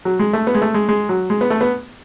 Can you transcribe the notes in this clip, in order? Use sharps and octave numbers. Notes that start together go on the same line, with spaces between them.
F#3
G#3
A3
B3
G#3
A3
G#3
G#3
F#3
G#3
B3
A3
B3